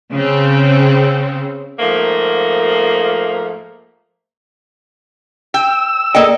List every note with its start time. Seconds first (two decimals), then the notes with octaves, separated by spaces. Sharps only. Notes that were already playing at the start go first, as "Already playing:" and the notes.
0.12 C#3 C4
1.80 G#2 F3 A3 A#3
5.54 G5 E6
6.15 A#3 G#4 A4 D5 D#5 G5